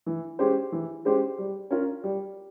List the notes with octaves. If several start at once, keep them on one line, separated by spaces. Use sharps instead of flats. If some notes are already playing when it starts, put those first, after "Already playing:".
E3
G#3 C#4 G4 C5
E3
G#3 C#4 G4 C5
G3
C#4 F4 A#4
G3